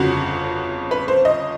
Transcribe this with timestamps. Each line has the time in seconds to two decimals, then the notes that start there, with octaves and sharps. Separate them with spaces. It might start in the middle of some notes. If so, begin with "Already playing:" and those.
Already playing: G1 F2 C#3 F#4
0.91 B4
1.08 C5
1.25 D#5